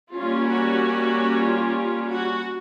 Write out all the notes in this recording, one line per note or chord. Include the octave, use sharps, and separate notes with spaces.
G3 A#3 C#4 F4
F#4
F4
F#4